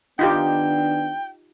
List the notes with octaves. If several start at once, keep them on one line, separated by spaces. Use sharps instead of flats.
D#3 B3 D4 D#4 F4 G4 G5